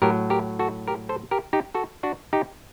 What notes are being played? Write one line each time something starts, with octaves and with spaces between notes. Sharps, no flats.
A2 F#3 G4 A#4
G4 A#4
F#4 A4
G4 A#4
A4 C5
G4 A#4
D#4 G4
F#4 A4
D4 F#4
D#4 G4